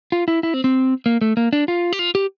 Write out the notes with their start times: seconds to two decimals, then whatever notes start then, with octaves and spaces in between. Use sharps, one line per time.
0.12 F4
0.28 E4
0.43 E4
0.54 C4
0.64 C4
1.06 A#3
1.21 A3
1.37 A#3
1.53 D4
1.68 F4
1.93 G4
1.99 F4
2.15 G4